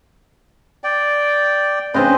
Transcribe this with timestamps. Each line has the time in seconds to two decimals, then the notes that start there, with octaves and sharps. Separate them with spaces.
0.84 D5 G5
1.94 C#3 C4 D4 B4 C5 D#5